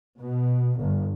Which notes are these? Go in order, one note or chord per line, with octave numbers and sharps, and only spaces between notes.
B2
G1